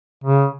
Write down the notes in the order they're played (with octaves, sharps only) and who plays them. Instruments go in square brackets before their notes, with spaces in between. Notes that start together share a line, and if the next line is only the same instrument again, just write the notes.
[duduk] C#3